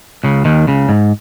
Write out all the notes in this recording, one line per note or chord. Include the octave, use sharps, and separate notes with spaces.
C#2 C#3
D#2 D#3
C#2 C#3
G#2